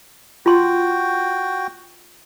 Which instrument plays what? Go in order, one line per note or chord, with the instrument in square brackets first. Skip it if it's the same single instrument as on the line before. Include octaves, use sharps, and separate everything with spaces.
[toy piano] F4 C6 [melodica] F#4 G5